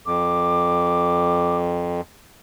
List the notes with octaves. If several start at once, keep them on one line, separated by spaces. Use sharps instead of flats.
F2 D6